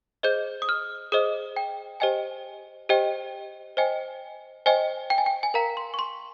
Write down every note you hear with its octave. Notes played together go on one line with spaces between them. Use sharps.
G#4 C5 D#5 G6
D#6
F6
G#4 C5 D#5 D#6
G5
G4 C5 D#5 G5 G#5
G4 C5 D#5 G5
C5 D#5 G5 G#5
C5 D#5 G5 G#5
G5
G#5
G5
G#5
A#4 F5 A#5
C6
C#6
C6